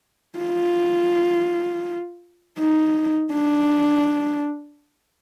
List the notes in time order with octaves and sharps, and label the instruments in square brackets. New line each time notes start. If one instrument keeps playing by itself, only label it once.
[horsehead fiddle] F4
D#4
D4